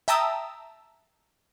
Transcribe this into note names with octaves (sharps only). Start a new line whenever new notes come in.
E5 G5 A5 A#5 D#6 E6